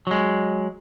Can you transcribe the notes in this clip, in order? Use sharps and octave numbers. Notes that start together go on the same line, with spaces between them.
F#3 G#3